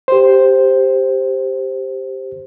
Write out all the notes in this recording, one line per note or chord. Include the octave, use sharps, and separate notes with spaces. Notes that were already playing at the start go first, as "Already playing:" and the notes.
G4 C5